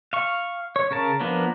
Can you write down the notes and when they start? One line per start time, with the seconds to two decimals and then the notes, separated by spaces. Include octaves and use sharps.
0.13 F5 C#6
0.76 C#5
0.91 C#3 A#4 A5
1.20 F3 A#3 B3 D4